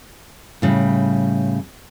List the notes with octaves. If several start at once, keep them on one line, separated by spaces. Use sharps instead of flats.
A2 C#3 G3